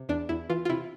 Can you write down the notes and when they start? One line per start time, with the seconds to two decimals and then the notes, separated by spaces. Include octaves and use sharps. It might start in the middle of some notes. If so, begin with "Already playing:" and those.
Already playing: C3
0.09 E2 D4
0.29 E2 E4
0.50 E3 F4
0.65 F4
0.69 C3 E4